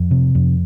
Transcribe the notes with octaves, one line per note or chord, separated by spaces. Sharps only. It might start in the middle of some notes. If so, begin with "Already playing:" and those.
Already playing: F2
C3
F2